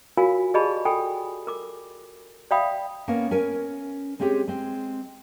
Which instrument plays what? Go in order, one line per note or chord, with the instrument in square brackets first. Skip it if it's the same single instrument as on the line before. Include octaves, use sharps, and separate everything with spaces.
[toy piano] F4 F#4 A#4 C#5 F5 G#5
G4 G#4 D5 D#5 A5 B5
A4 G5 G#5 B5
A#4 D6
D5 E5 F5 G5 B5 D#6
[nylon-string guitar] A#3 B3 C#4
C#4 A#4 G#5
G#3 C4 C#4 G4 G#4
G#3 C4